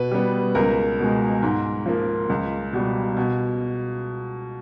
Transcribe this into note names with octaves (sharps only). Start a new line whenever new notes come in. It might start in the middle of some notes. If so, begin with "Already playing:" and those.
Already playing: B2 B4
G3 B3
C#2 A#4
B2 G#3
G#2
F3 A#3
C#2
B2 G3
B2